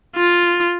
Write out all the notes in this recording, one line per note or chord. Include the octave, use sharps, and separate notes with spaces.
F4